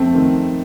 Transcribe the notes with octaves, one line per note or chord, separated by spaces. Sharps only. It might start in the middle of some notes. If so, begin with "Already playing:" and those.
Already playing: F2 A3 C4
D#3